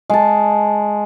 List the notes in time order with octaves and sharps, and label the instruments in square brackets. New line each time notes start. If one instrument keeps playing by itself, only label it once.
[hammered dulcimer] G#3 A5